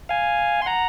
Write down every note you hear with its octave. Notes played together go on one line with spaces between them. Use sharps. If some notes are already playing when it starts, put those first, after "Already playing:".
F5 G#5
C6
F#5 A#5